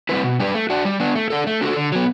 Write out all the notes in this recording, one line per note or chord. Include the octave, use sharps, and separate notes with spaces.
G3 C4 E4 B4
B2
G3 D4 G4 B4
A3
D4 F#4
G3
B3 D4
A3
D4 A4
A3
D4 F#4 A4
D3
F#3 B3